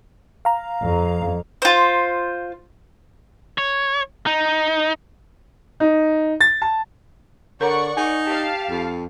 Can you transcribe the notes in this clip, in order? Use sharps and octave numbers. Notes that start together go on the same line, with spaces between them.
F5 A#5
F2
F4 C5
C#5
D#4
D#4
A6
A5
D3 A#4 C#5 D5 F#5 A#5 C#6
D#4 G#5
G4 F5 A5
F2